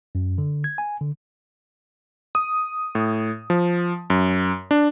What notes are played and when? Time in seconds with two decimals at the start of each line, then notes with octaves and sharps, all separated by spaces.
0.15 F#2
0.38 D3
0.64 G#6
0.78 G#5
1.01 D3
2.35 D#6
2.95 A2
3.50 F3
4.10 F#2
4.71 D4